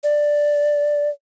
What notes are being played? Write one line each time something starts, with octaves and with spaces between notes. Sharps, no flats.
D5